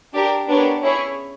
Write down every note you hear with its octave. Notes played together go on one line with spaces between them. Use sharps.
D4 G4 A#4
B3 D4 G4 A#4 C#5
C#4 E4 G#4 C#5